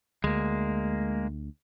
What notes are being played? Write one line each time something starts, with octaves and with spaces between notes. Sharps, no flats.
D2 G#3 A#3